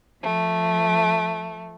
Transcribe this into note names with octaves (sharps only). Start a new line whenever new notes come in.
F3 A3